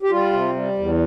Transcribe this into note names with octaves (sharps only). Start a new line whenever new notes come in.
G4
G3 F4
C3
G3
E2